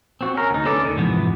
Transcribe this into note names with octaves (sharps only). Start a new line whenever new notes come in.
C4 F#4
C#4 A#4
D2 D#4
C#4 A4 B4 D5
D2 D#3
F2 G#2 C3 E3 B3